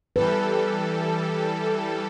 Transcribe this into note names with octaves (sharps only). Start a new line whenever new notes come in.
E3 G3 A4 B4